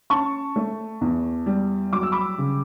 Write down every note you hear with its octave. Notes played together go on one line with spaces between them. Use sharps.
C#4 A5 C#6
A3
E2
G3
F#3 D6
E6
B5 D6
C#3